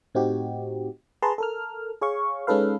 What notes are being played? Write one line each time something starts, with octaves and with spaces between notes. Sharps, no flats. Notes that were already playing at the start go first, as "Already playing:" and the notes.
A2 C4 D#4 F#4 G4
G#4 B4 A5 A#5 C6
A4 A#4 F6
G#4 C#5 F5 C#6
G#3 C#4 D#4 A4 B4 F5